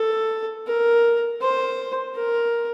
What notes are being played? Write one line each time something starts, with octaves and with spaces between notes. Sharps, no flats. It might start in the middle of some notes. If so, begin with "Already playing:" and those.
Already playing: A4
A#4
C5
A#4